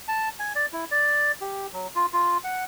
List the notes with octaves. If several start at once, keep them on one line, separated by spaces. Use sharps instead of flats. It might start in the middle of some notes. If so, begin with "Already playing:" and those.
A5
G#5
D5
E4
D5
G4
F#3
F4
F4
F#5